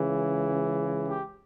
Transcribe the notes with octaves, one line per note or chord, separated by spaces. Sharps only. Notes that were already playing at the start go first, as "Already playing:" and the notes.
Already playing: C#2 C#3 E3
G4